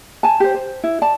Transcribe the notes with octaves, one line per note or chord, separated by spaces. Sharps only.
G#5 A5
G4 C5
C5
E4
D5 A5